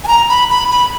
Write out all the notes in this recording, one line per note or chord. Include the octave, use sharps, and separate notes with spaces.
G#5
A#5
B5
B5
B5